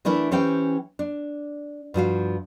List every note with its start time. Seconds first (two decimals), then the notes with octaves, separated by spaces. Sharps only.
0.05 E3 A3 D4 E4 A#4
0.32 E3 C#4 G4 C5 G5
0.99 D4
1.94 G2 F3 F#4 F5